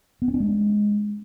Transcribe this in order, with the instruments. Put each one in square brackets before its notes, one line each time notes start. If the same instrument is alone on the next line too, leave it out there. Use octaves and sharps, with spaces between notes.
[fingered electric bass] B3
C#4
D4
G#3